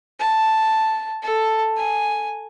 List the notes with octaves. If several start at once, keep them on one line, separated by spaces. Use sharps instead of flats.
A5
A4 A5
G#5